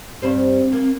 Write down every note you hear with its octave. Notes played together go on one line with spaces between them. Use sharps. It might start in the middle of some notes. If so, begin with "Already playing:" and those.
G2 G3 C4 C5
A#3